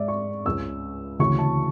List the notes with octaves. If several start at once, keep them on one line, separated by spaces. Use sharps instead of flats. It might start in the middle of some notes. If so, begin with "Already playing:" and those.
Already playing: G#2 G#3 D5 E5
C#6
C#2 C#3 G#3 E6
D2 C#3 E3 C#6
A5